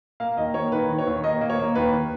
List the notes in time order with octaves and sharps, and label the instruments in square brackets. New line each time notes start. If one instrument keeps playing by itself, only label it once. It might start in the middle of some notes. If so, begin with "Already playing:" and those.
[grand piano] A#3 F5
D#2 D#5
A#3 C#5
D#3 B4
D#3
C#5
D#2
A#3 D#5
A#3
C#5
A#3
D#2 B4